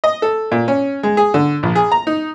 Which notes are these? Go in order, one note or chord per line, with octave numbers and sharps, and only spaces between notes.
D#5
A4
A#2
C#4
G#3
G#4
D3
A#1
G#4
A#5
D#4